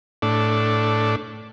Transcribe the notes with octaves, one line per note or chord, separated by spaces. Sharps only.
A2 D4